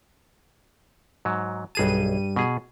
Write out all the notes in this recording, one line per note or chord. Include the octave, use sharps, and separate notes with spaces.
G#2 F#3
B1 G2 G#4 A5 D#7
B2 G#4